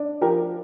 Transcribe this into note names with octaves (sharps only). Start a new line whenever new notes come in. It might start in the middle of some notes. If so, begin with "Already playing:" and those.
Already playing: D4
F3 G4 A#4